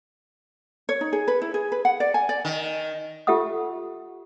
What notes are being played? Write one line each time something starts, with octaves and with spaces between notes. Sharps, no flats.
C#5
D#4
G#4
B4
E4
G#4
B4
F#5
D5
G#5
D5
D#3
F4 G4 A4 E5 F#5 D#6